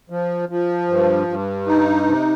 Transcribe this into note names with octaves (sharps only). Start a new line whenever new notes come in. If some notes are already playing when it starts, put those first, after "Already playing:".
F3
F3
G2
G2
D#4
C3